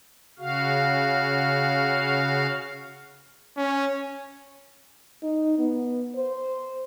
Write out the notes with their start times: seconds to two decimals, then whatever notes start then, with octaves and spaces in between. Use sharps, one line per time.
0.39 C#3 F#4 F5
3.57 C#4
5.23 D#4
5.59 B3
6.16 C5